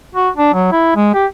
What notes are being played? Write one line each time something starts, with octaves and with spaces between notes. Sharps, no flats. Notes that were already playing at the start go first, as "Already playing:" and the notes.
F#4
D4
F#3
E4
G#3
G4